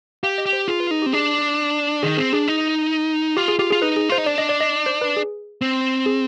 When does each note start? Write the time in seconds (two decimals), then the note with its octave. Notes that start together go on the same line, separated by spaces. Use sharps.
0.23 G4 F5
0.38 D#5
0.46 G4
0.53 C5
0.68 F4 G#4
0.80 B4
0.91 D#4 G#4
1.02 G4
1.06 C4
1.13 D4 G#4
2.03 D#3 G#4
2.17 C4 G#4
2.33 D4 G#4
2.48 D#4
3.37 F4 G4
3.48 G#4
3.59 F4 G4
3.70 F4 G#4
3.82 D#4 B4
3.97 G#4
4.09 F4 C5
4.18 D#4
4.26 D4 D5
4.38 D#5
4.49 D5
4.60 D#5
4.86 C5
5.01 B4
5.17 G#4
5.62 C4
6.06 G#4